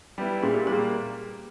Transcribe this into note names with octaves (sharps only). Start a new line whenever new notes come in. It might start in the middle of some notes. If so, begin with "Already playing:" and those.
G3 B3 E4
A#2 G#4
G4
G3 A#3 G#4